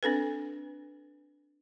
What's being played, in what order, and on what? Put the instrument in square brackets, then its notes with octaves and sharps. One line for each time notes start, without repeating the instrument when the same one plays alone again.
[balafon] C4 D4 A4 B4